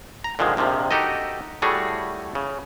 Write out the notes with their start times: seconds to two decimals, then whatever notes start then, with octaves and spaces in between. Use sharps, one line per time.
0.24 A#5
0.39 A#2 D3 D#3 F3 G#3
0.57 A#1 C3 D#3 F3
0.91 D#4 F#4 G4 A4 D#5
1.62 A2 G3 A3 F#4 G#4
2.35 C#3